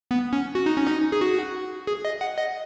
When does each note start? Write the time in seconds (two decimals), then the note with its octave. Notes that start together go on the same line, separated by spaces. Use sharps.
0.11 B3
0.33 C#4
0.55 F#4
0.66 D#4
0.77 C#4
0.87 D#4
1.12 G#4
1.21 F#4
1.87 G#4
2.05 D#5
2.21 F#5
2.38 D#5